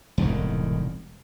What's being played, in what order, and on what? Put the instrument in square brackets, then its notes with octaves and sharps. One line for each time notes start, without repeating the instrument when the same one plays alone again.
[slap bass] E1 C2 A2 D#3